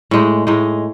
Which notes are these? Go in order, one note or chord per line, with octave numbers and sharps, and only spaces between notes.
A2 G#3 D#4
A2 G#3 D#4